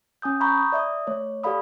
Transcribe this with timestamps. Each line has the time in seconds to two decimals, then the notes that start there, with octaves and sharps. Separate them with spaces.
0.22 C#4 G#5 D#6 G6
0.41 A#5 B5 C#6 G6
0.57 D#6
0.72 D5 E5 D#6
1.07 A3 C#5
1.43 G4 A4 D5 F5 B5 D#6